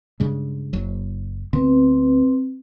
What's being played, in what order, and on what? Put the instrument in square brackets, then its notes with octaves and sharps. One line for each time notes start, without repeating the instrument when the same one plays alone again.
[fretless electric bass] G2 C#3 G#3
F#1 F#3
[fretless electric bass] D2 D3 B3 [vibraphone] C4 B4